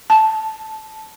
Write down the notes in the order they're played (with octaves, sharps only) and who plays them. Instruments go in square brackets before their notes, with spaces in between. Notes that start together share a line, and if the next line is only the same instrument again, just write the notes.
[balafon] A5